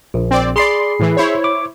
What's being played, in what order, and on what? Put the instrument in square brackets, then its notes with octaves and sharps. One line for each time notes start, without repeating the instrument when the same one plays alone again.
[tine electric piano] A#1
[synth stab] C4 D5
[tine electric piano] G#4 B5 C7 [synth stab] D5 C6
[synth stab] A2 E3
E4 C5 C#5
[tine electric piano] D6